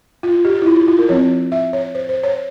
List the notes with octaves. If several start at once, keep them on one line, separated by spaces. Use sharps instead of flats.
F4
F4
G4
G4
E4
F4
E4
F4
A#4
F3 C4 C#5
E5
C#5
C5
C5
C#5